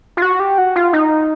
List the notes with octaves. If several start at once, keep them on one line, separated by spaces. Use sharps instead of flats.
F4
F#4
G4
F#4
F4
D#4